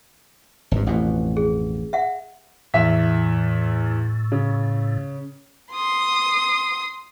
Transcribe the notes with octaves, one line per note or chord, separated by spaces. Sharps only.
G#1 G2
A1 F2 B2
G#4
E5 F#5
E2 A2 E5 B6
C#3
C6 D#6